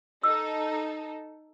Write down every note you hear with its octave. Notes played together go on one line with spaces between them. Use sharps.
D#4 A4 E6